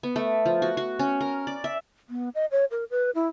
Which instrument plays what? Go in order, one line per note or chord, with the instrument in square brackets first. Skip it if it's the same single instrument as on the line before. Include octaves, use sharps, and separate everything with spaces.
[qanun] B3
A3
F3
F#4
F#4
C#4
A#4
D5
E5
[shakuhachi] B3
D#5
C#5
A#4
B4
E4